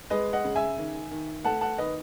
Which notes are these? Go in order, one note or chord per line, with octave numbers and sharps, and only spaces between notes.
G#3 B4 D#5
D#5 F#5
C#3
E5 G#5
D#3
D#3
A3 F#5 A5
F#5 A5
D#3 B4 D#5